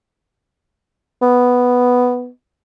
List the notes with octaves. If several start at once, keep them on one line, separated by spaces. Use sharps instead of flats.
B3